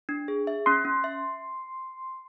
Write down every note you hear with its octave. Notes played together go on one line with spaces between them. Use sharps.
D4
G#4
E5
C#4 C6
C#4
E5